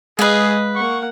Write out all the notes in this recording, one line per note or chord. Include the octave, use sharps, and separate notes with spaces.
G#3 G#4 B4 D#5 F5
A#3 F#5 C#6